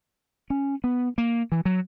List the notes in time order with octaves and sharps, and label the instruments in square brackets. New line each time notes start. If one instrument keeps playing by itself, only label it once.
[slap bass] C#4
B3
A#3
E3
F#3